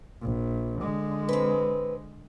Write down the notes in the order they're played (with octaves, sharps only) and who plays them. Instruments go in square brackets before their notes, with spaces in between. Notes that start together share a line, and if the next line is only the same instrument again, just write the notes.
[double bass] A#1
D3 G#3
[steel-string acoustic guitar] C4 B4